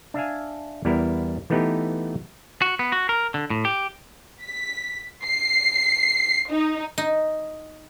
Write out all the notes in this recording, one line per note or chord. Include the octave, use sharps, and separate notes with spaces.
D4 E5 F5 G#5
E2 G3 B3 E4 A#4
E3 A3 B3 D#4 G4 B4
F#4
B3
F#4
A#4
D3
A2
G4
B6
C7
D#4
D#4